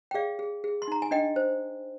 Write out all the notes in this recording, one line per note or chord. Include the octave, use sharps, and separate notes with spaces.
G5
G#4 D5 F5
G#4
G#4
C6
D#4 A#5
G#5
D4 D#5 G5
C5